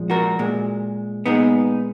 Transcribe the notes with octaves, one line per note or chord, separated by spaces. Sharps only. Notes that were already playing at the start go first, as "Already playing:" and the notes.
Already playing: A#2 F3 G#3
F#4 A#4
A#2 G#3
A#2 G#3 B3 D#4